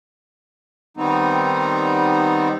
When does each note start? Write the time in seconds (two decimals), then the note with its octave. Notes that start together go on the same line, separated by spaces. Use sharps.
0.97 D#3 G3 B3 C4 D#4